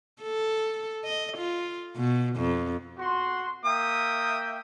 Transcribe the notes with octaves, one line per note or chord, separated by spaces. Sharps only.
A4
D#5
F4
B2
F2
F#4 C6
A#3 E5 G5 D#6